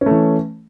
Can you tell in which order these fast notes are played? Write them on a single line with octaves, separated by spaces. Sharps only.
C#4 A3 E3